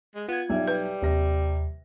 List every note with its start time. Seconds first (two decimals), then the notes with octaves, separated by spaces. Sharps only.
0.15 G#3
0.28 B3 F4 G#6
0.50 B1 G3 E5
0.68 B4
1.02 D#2 C3 A#6